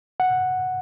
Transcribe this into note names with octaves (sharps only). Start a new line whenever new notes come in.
F#5